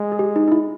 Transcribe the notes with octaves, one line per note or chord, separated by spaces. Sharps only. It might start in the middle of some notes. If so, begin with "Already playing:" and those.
Already playing: G#3
G#4
G4
D#4
D#4
E4